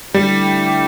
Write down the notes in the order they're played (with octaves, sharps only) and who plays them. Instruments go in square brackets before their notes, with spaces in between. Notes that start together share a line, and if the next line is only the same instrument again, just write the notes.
[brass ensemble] D3 A3 E4 G4 [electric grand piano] G3